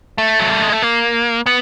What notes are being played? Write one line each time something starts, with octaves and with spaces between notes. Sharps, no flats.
A3
F#3
G3
G#3
A3
A#3
B3